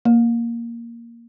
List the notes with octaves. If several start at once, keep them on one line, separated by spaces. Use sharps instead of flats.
A#3